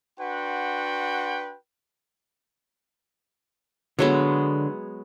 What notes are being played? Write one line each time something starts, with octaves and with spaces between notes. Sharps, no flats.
D4 F#4 B4 F#5 G5 C6
D3 F#3 G#3 B3 A4 C#5